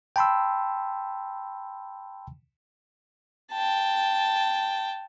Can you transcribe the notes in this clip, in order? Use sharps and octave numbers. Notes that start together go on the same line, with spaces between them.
G5 A5 B5 C6 E6
G5 A5